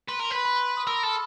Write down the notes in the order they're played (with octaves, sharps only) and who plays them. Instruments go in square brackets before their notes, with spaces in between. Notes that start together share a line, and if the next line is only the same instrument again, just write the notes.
[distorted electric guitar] B4 [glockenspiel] C6
[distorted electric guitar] A#4
[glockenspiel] C6
[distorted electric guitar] B4 [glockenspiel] B5
[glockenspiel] B5
C6
D#6
[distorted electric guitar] A#4 [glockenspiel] E6
[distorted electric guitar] A4 [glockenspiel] F6